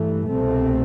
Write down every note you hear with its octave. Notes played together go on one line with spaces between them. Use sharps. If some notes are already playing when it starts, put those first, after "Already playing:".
Already playing: G2 E3 A3
C2 B2 A3 C4